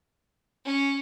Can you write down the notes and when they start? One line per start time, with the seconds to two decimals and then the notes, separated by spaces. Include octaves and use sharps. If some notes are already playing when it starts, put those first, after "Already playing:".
0.65 C#4